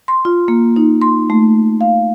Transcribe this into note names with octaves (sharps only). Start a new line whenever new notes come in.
C6
F4
A#3
D#4
C6
A3
F5